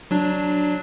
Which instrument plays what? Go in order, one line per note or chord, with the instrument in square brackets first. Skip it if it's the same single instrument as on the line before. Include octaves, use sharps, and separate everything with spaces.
[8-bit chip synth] F#3 D4